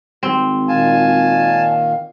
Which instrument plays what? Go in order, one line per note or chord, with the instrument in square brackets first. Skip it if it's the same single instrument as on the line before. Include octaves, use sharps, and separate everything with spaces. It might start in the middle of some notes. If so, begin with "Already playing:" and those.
[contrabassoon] G#1 [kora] C4
[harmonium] A#2 D#3 F5 [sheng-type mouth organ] G#5 A5